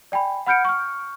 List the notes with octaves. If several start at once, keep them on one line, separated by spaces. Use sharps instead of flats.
D5 G5 G#5 B5
F#5 B5 F6 G6 C#7 D7
C#6 F6